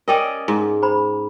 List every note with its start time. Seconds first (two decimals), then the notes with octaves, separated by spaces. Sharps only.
0.08 C#4 A#4 D5 D#5 G5 D#6
0.48 G#2
0.82 C5 A#5 B5